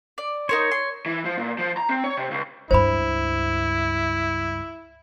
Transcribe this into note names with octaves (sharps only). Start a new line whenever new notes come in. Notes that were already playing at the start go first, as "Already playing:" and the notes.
D5
D#4 A#4 C5 C#5
C6
E3
F3
A#2
F3
A#5
C4
C#5
C3
C#2
C#2 G2 E4 C5 B5